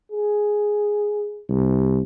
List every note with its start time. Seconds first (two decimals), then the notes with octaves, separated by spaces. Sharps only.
0.12 G#4
1.49 C2